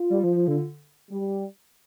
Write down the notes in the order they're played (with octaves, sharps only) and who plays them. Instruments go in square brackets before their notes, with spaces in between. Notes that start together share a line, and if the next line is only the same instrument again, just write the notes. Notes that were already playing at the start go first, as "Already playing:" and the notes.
Already playing: [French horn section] F4
[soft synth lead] G3
F3
F3
D3
[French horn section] G3